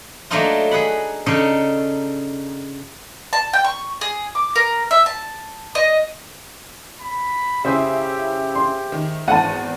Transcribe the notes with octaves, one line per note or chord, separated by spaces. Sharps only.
F#3 A3 A#3 D4 D#4 F4
G#4 F#5 B5
C#3 D4 D#4 A4 C#5
A5
G5
C#6
G#4
D6
A#4
E5
A5
D#5
B5
C#3 E4 G4 G#4 C5 E5
C6
D#3
G#1 E2 F#5 A5 D#7